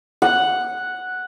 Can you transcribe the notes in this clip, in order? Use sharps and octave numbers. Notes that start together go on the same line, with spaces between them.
F#5